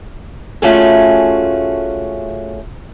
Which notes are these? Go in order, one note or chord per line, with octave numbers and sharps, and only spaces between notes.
A3 C#4 F4 F#4 G#4 A4